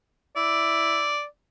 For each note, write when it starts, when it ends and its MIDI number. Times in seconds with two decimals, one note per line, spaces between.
0.36 1.11 64
0.36 1.25 74